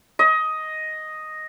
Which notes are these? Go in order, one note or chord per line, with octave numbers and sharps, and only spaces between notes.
D#5